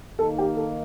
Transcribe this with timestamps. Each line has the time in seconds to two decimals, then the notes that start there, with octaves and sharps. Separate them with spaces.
0.19 D#3 A#3 D#4 A4
0.38 G4
0.56 A4